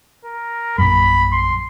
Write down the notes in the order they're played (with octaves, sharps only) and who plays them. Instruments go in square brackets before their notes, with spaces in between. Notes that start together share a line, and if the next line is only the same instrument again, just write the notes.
[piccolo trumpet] A#4
[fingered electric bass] A#1 F#2 [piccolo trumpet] B5
[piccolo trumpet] C6